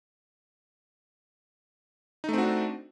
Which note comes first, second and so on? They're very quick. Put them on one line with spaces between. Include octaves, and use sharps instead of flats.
D#4 A3 C4 F#4 D4